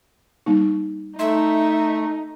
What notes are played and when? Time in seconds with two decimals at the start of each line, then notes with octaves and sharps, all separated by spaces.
0.46 G3 A#3 D#4
1.19 A3 D#4 E5 C6